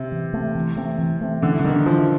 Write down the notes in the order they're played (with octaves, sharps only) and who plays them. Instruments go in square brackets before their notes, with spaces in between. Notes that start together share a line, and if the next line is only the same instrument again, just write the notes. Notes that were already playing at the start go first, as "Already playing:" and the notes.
Already playing: [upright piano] C3
[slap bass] E3
A3 C4
E3
A3 C4
E3
A3 C4
[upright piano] D3 [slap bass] E3
[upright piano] D3
[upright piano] D#3 [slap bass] G3 B3
[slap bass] E3 [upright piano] F3